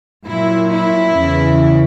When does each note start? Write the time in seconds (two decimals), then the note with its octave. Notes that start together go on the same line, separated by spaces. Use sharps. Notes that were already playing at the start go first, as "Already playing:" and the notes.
0.25 A#2 F#3 E4
0.70 E4
1.15 E2 C#3 E3